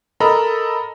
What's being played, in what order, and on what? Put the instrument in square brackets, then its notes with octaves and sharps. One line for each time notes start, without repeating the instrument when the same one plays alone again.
[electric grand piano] A4 A#4 D#5 A#5 B5